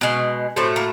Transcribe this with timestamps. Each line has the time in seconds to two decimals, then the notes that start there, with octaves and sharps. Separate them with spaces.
0.01 B2 G#3 C#4
0.56 A2 F#3 A3 C4
0.76 A#3